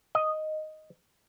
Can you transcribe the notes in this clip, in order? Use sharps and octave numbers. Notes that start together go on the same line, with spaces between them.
D#5